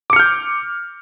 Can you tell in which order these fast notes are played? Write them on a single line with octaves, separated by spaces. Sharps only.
D6 C#7 F6 G6